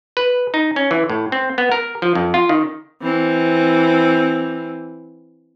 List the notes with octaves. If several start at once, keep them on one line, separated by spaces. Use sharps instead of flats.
B4
D#4
C#4
E3
A2
C4
B3
A#4
F3
F2
F4
D#3
E3 C4